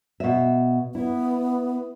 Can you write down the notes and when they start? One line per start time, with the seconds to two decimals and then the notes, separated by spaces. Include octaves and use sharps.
0.20 B2 E5
0.95 B3 E4